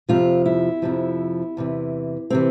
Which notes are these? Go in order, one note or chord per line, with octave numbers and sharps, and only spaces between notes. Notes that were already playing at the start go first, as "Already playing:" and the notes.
F2 C3 F3 F4
E4
F2 C3 F3
E2 C3 E3
C3 E3 C4